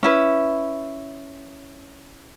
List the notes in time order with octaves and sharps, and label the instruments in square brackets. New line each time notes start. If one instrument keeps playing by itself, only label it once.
[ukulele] C#4 E4 B4